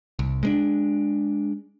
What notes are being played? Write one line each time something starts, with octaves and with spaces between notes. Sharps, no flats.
C2
G#3 A#3 D4